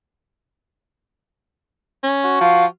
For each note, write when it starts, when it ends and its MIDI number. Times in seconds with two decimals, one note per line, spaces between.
2.03 2.40 61
2.24 2.65 66
2.41 2.66 53
2.41 2.65 77